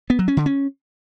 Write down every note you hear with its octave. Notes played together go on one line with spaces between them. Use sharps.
B3
F#3
C#4
D3
C#4